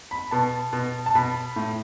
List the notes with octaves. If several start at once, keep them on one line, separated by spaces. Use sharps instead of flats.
B5
B2 A5
B2
A5
B2 B5
A2